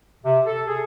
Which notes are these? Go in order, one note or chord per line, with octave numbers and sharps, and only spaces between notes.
C3
A4
G#4